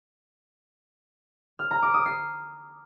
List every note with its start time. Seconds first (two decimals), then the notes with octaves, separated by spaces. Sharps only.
1.59 F6
1.71 A#5
1.82 D6
1.94 D#6
2.06 C7